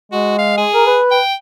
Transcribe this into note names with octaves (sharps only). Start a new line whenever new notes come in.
G#3 F#4
F5
G#4
A#4
B4
G5